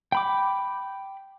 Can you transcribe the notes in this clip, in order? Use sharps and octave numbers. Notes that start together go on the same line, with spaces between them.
G5 B5 D6